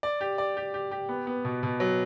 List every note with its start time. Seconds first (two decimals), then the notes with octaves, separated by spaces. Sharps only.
0.03 D5
0.21 G4
0.38 D5
0.57 G4
0.74 G4
0.91 G4
1.09 B3
1.27 B3
1.45 B2
1.63 B2
1.80 F#3